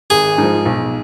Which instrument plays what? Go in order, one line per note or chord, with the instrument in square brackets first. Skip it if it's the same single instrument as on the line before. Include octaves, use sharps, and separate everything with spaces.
[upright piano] G#1 [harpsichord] G#4
[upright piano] G#2 F3
B1